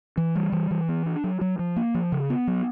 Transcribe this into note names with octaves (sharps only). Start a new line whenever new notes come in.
E3
G3
E3
E3
B3
D4
F#3
F#3
F3
A#3
F3
C#3
B3
F#3